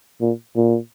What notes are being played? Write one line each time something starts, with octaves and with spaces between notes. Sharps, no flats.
A#2
A#2